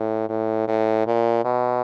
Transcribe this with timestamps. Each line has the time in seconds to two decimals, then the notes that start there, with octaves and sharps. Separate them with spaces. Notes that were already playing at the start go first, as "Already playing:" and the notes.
Already playing: A2
0.29 A2
0.68 A2
1.07 A#2
1.45 B2